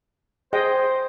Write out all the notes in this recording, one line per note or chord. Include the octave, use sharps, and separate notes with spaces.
G#4 C5 D#5 G5